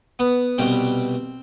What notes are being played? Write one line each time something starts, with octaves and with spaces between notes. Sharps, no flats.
B3
C2 B2 G3 C4